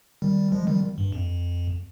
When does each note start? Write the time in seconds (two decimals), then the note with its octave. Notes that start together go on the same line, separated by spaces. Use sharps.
0.22 D#3 G3
0.52 F3 G#3
0.67 D#3 G3
0.98 G2
1.12 F2